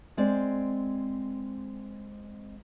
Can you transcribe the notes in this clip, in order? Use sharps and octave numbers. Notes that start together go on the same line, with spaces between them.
G#3 C4 D5